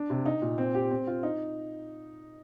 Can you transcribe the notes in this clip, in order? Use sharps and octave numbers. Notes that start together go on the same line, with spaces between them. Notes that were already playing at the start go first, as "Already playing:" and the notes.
Already playing: D4
C3
D#4
A#2
C4
G4
C4
F4
D#4